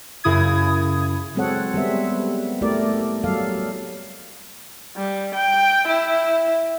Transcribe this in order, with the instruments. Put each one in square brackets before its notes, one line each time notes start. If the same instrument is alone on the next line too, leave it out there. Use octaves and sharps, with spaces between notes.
[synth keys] F#2 C#3 E4 D#6 G#6
[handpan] F#3 G#3 C4 A4 C#5 F#5
G3 G#3 B3 C4 A4 E5
A3 E4 G4 A#4 D5
F#3 G3 A4 F5
[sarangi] G3
G5
E4